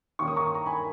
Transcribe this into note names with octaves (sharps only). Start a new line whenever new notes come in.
D#2 D#3 A#3 C#4 C#6
D#6
A#5 C#6
A#5
G#5 B5